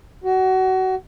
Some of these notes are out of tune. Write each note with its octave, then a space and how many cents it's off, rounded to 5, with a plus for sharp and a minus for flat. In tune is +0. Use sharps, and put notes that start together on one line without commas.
F#4 +25